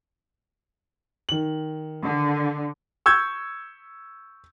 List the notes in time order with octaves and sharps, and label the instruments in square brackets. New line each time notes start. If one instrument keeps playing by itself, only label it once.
[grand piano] D#3 F#7
[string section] D3
[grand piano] C#6 E6 G6 G#6